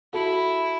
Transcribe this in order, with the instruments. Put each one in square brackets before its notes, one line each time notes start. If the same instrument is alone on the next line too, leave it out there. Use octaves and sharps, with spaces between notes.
[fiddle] E4 [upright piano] F#4 A4